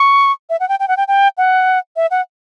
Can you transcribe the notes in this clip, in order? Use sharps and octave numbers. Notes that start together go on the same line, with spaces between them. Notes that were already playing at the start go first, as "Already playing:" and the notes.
Already playing: C#6
E5
F#5
G5
G5
F#5
G5
G5
F#5
E5
F#5